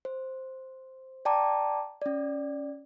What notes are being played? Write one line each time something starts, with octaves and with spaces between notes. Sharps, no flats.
C5
D5 G5 A5 A#5 D6
C#4 D5